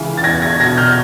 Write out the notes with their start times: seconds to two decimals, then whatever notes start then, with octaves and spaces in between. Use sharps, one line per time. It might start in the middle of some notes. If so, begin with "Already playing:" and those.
Already playing: C#2 C#3 E3
0.17 A6
0.24 E2 G#6 A#6
0.42 G#6 A#6
0.60 B2 G#6 A#6
0.78 F6 G6